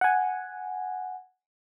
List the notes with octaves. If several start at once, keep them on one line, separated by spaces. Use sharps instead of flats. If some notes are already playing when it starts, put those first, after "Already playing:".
F#5 G#5